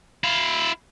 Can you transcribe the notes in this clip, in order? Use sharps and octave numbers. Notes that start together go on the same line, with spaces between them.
E4 F5